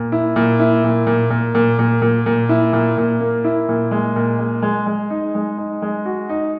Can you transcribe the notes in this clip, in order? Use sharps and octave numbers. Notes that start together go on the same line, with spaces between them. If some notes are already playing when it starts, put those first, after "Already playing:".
Already playing: A#2
E4
A#2
E4
A#2
A#2
A#2
A#2
A#2
A#2
A#2
E4
A#2
A#2
A#3
E4
A#2
G#3
A#2
G#3
G#3
G#3
D#4
G#3
D#4
G#3
F#4
D#4